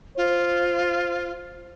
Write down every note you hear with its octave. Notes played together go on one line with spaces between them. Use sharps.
F4 C5